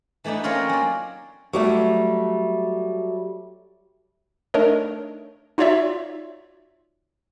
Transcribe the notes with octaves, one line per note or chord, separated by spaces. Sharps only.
E3 A3 B3 D4 D#4
A#3 C4 C#4 F4 A#4 C#5
F#3 D5
F#3 G3 A3
A3 D4 D#4 A#4 C#5 D#5
D#4 F4 F#4 C#5 D5 E5